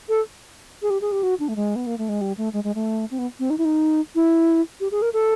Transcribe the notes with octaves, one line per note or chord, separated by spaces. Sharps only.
A4
G#4
G4
G#4
G4
F#4
D4
A3
G#3
B3
A#3
A3
G#3
G3
A3
G#3
G#3
A3
C4
B3
C4
D#4
E4
D#4
E4
G4
G#4
A#4
A4